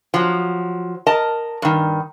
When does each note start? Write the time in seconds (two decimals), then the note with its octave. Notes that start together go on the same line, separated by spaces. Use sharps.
0.14 F3 F#3
1.07 A#4 D#5 A5
1.62 G2 D#3